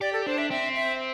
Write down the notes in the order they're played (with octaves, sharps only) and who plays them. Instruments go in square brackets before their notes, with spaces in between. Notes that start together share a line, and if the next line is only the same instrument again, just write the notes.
[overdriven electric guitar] G4 [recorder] D5
[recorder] A4
[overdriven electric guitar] D4 [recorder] C5
[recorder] E5
[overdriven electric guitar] C4 [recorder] E5
[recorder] E5